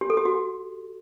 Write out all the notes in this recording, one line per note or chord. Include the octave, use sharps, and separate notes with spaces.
G4
A4
G4
F#4